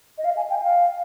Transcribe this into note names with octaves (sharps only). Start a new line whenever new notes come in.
D#5
F5
G#5
G5
F5